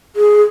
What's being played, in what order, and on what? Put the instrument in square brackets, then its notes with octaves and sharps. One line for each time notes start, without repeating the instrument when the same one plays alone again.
[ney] G#4